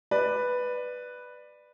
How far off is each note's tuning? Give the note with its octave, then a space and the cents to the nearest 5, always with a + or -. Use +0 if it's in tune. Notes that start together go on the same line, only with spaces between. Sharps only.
B4 +0 D5 +15